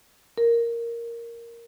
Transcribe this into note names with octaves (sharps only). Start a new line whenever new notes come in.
A#4